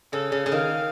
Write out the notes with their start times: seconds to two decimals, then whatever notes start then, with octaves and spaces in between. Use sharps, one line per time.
0.12 C#3 A4
0.32 C#3
0.46 C#3
0.52 D#3 F5